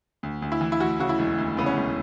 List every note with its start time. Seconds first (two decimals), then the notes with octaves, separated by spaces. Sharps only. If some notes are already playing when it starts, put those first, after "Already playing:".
0.23 D2
0.42 D2
0.52 E4
0.61 E3
0.72 E4
0.80 E3 F#4
1.00 C#3 F#4
1.09 E4
1.19 E1
1.38 D2
1.57 C#3 B3
1.66 C#4
1.77 E1